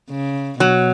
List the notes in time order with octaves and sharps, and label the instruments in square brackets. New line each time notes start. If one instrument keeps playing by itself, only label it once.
[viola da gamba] C#3
[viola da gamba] B2 [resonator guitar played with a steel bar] F#3